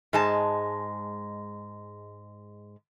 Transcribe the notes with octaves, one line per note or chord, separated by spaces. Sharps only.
G#2 G#3 A5